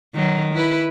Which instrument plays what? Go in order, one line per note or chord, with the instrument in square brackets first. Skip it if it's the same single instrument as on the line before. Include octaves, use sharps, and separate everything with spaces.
[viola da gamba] D#3 F#3
E4 B4